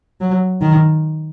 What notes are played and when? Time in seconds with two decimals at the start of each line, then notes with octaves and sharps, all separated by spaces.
0.21 F#3
0.61 D#3